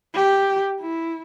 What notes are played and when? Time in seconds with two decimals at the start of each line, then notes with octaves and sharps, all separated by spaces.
0.14 G4
0.81 E4